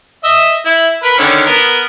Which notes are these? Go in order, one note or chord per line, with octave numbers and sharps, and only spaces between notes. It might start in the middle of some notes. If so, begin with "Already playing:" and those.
D#5 E5 E6
E4
A#4 B4 B5
D3 D#3 C#4
B3 A#4